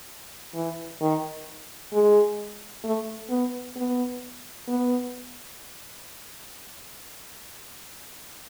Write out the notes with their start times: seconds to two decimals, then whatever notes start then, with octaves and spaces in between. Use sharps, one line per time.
0.55 E3
1.01 D#3
1.93 G#3
2.84 A3
3.30 B3
3.76 B3
4.68 B3